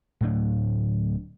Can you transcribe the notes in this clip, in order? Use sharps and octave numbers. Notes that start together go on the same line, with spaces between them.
D1 A2 F#3 D4